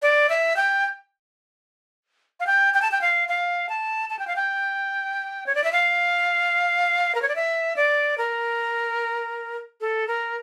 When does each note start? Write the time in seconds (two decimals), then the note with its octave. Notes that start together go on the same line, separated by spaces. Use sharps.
0.02 D5
0.29 E5
0.56 G5
2.40 F5
2.47 G5
2.74 G5
2.82 A5
2.91 G5
3.01 F5
3.29 F5
3.69 A5
4.10 A5
4.19 G5
4.27 F5
4.36 G5
5.46 C#5
5.55 D5
5.64 E5
5.72 F5
7.15 A#4
7.22 C#5
7.28 D5
7.36 E5
7.76 D5
8.18 A#4
9.81 A4
10.07 A#4